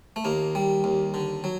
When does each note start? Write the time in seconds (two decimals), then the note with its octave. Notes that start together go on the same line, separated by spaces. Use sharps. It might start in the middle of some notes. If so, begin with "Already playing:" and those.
0.16 A3
0.25 D#2 A#3
0.55 G3
0.84 D#2
1.14 D3
1.44 F#3